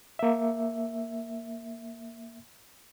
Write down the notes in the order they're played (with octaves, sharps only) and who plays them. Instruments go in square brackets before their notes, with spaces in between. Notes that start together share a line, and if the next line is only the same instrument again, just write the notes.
[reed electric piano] A#3 E5